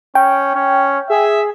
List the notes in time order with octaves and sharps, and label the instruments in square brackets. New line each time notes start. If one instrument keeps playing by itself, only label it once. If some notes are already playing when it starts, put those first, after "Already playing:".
[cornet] C#4 [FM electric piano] G5
[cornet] C#4
[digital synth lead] G#4 [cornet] E5